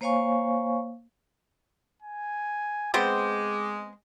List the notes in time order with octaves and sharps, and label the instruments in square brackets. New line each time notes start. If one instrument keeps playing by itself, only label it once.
[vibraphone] A#3 C5 C#5 F5 G#5 C#6
[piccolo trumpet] G#5
[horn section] G#3 [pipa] B3 C4 C5 [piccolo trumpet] D6